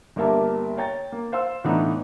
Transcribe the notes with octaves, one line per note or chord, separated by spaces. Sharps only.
G1 A#3 G4 A#4 E5 A5
C#5 G5 A#5 A6
A#3
C5 F5 C6 E6
A2 E3 A3 B3 D4 D#4